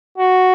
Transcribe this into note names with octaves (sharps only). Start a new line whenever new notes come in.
F#4